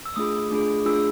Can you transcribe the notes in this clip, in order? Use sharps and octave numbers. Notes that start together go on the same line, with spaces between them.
E6
A3 D4 F4 G#4 D#6
A3 D4 F4 G#4
A3 D4 F4 G#4 E6